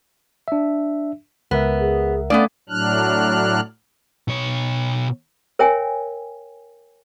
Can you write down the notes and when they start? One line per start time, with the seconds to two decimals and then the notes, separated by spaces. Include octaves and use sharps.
0.48 D4 E5
1.51 C#2 B3 A#4 E5
1.80 G#4
2.30 A3 B3 C#4 D5 F5 D6 D#6
2.69 A2 F#3 D4 F6 F#6
4.28 B2 C#5
5.59 A#4 C#5 E5 G5 G#5